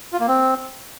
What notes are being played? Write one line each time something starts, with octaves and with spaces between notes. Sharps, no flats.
F4
A#3
C4